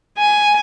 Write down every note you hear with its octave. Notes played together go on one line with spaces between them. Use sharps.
G#5